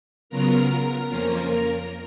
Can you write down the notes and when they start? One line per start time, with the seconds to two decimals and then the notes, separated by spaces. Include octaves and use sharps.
0.30 C#3 F#3 B3 F4 A#4 A#5
1.08 F2 F3 A#3 C#4 F4 A#4 A#5